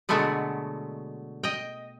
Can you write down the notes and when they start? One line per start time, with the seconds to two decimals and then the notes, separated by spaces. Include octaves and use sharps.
0.09 B2 D3 F#3 G#3 A3 B3
1.43 D#5 G5